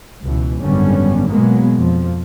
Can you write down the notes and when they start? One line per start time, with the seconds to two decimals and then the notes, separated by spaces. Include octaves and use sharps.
0.22 C#2 B2 E3
0.60 G#1 F#2 D3 G3 B3 C#4
1.27 B2 F#3 G#3 A#3 B3
1.78 F2 F3